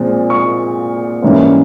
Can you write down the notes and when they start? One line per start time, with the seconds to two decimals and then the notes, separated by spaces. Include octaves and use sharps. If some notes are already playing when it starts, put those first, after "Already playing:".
Already playing: A#2 F3 G#3 C4
0.30 C#6
1.23 G#2 E3 G3 A#3 C#4